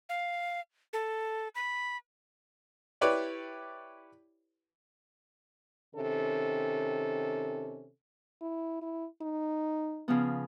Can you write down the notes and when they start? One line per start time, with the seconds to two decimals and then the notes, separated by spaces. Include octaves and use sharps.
0.09 F5
0.93 A4
1.55 B5
3.01 E4 G4 B4 C#5 D5
5.95 C3 D#3 C#4 A4
8.41 E4
8.82 E4
9.21 D#4
10.08 C#3 F3 B3